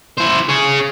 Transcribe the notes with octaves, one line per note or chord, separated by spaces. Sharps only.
E4 C5
G#4 C#5